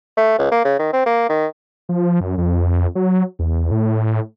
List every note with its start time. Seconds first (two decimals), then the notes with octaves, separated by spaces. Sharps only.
0.17 A3
0.38 C#2
0.52 A#3
0.65 C#3
0.79 D#3
0.93 C4
1.06 A#3
1.29 D#3
1.89 F3
2.21 F#2
2.38 F2
2.95 F#3
3.39 E2
3.71 A2